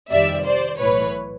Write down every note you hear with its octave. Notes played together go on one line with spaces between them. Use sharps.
F2 C3 D#3 G3 D5 E5
C5 D5
B1 A2 E3 B4 C#5